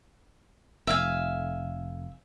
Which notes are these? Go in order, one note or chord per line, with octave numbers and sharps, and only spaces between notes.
F1 E5 F5 G#5